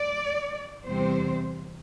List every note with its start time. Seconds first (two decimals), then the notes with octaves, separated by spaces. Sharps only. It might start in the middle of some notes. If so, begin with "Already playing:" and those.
Already playing: D5
0.86 E2 C3 G3 C4 C5